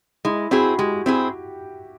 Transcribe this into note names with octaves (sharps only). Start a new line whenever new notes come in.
G#3 E4
C4 E4 F#4 G#4
G#3 G4
C4 E4 G#4